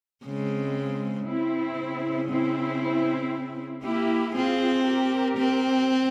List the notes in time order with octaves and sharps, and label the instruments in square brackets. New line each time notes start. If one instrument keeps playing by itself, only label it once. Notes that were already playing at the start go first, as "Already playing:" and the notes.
[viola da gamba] C#3 [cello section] G#3 C4
[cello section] C4 E4
[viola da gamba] C#3
[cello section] C4 E4
[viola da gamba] A#3 [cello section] E4 G4
[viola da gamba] C4 [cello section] F4 G#4
[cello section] G4 A#4
[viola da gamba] C4